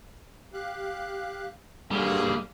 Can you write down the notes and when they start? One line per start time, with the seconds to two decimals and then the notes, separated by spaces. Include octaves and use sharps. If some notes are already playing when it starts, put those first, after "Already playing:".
0.53 G4 F5 F#6
1.91 G2 G3 A#3 F#4 G#4 A4